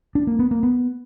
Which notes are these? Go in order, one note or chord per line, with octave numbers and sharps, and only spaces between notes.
D4
A#3
B3
A#3
B3